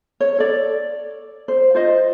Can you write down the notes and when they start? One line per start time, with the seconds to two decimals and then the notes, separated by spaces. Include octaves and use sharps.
0.20 C#5
0.39 A4 D5
1.48 C5
1.75 F4 C5 D#5